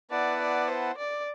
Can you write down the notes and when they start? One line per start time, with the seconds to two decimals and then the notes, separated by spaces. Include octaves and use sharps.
0.11 B3 E4 B4 D5 F#5 A5
0.40 D5
0.68 C5
0.98 D5